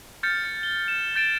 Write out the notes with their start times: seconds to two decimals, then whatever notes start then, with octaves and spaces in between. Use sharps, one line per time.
0.23 F6 G6 A6 C#7
0.44 C#7
0.63 G7
0.88 E7
1.16 G6 A6 D7 E7